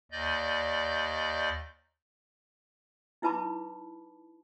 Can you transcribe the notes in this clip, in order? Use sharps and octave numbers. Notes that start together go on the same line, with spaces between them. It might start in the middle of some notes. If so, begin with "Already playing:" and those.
D#2 D5 D#5 G6
D#4 E4 B4 A5 B5 D6